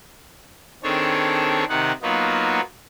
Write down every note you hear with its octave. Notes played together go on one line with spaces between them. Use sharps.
D#3 C4 D4 G#4 A4 C#5
C3 D#3 D#4 F#5
F#3 A#3 B3 D#4 F4 F#4